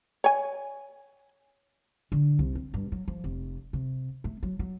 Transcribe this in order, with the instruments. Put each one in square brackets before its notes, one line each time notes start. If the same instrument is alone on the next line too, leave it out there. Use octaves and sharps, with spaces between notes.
[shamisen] C#5 G#5
[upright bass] D3
C2
C4
G2
F#3
F3
F1
C3
A3
F#3
F#3